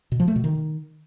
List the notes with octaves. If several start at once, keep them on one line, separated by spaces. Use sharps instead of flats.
B2
F3
A3
B2
D#3